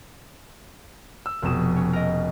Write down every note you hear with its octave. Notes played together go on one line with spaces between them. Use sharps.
E6
F1 B2 F3 D#6 E7
C#4
A#4 D#5